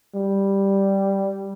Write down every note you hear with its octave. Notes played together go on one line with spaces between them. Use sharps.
G3